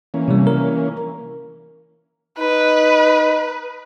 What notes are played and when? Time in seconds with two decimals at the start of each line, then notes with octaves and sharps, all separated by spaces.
0.14 E3 A#3 C#4
0.28 C3 G3
0.47 A#4
2.39 D#4 B4